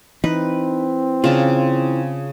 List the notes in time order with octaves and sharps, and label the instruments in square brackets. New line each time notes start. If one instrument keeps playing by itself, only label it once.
[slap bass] E3 [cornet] C4 [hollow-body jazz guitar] D#4 [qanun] B4
[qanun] C#3 A5 [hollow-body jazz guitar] D4 F4